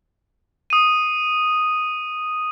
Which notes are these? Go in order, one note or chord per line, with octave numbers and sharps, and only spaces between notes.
D#6 D#7